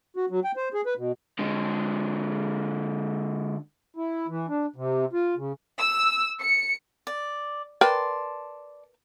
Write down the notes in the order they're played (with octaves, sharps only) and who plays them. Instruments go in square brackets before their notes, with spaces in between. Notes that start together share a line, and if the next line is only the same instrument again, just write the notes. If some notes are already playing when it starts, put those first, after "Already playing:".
[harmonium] F#4
F#3
G5
C5
G#4
B4
B2
[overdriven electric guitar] D3 G#3
[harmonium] E4
E3
D4
C3
F4
C#3
[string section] E6
C#7
[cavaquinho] D5
[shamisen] A#4 B4 G5 [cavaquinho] D5 A5 C6